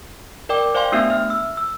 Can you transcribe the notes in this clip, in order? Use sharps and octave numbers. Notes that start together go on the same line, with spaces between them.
A#4 D5 G5 D6
C5 D5 F5 G5 G#5 C6
A3 B3 D4 F#4 E5
E5 F6
E6
E6